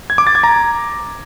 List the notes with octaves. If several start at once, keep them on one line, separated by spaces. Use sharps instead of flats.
G#6
D6
A6
G#6
A#5